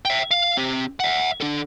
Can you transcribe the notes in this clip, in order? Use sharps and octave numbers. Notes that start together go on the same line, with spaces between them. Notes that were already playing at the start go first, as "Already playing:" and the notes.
E5 G5
F5
C4 G4
E5 F#5
D4 A4